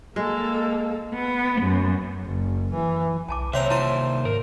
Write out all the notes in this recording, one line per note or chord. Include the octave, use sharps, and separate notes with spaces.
G#3 A#3 A4
B3
F#2
F#1
E3
B1 G#5 A5 D6
D#2 C3 C4 C5 C#5 E5 F5 A#5
E4 F4 C5 A5
G#2 A#4